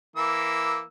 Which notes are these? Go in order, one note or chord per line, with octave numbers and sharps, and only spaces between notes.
E3 A#3 E6